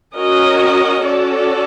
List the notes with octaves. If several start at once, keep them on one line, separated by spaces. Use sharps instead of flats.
C#4 F#4 A#4 D#5
C#4 F#4 A4 D5